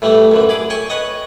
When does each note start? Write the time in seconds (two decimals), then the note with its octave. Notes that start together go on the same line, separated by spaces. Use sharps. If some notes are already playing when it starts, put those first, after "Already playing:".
0.02 A2 E3 G3 A3
0.32 F#2 D3 E3
0.49 G#4 B5 D6
0.70 C#5 G5 G#5 C#6
0.90 B4 C#5 D#5